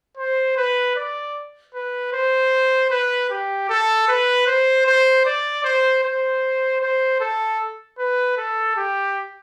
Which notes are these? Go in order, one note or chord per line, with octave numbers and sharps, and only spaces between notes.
C5
B4
D5
B4
C5
B4
G4
A4
B4
C5
C5
D5
C5
C5
C5
A4
B4
A4
G4